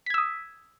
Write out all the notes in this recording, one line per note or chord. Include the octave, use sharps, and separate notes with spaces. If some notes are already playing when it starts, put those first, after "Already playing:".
D#6 E6 G#6 B6